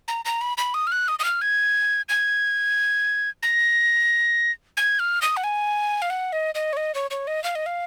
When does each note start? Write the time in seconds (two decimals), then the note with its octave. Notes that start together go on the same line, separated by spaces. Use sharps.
0.08 A#5
0.25 A#5
0.41 B5
0.58 B5
0.74 D#6
0.87 F6
0.92 F#6
1.08 D#6
1.19 D#6
1.24 F6
1.42 G#6
2.09 G#6
3.43 A#6
4.77 G#6
4.99 F6
5.22 D#6
5.37 F#5
5.44 G#5
6.02 F5
6.10 F#5
6.33 D#5
6.55 D#5
6.73 C#5
6.77 D#5
6.95 C#5
7.11 C#5
7.27 D#5
7.44 F5
7.55 D#5
7.66 F5